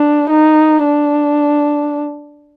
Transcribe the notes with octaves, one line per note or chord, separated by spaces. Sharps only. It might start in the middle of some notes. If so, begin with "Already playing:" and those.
Already playing: D4
D#4
D4